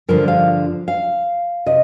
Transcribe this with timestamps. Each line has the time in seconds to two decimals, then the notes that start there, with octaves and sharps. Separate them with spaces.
0.08 G2 D3 F3 A#4
0.28 F5
0.88 F5
1.66 C3 D#5